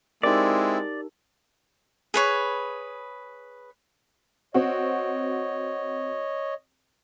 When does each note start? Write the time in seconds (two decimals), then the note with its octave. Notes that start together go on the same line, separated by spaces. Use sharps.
0.23 G#3 C4 D#4 E4 G4 A#4 D5
2.14 G#4 B4 C#5
4.54 C4 F#4 C#5 D#5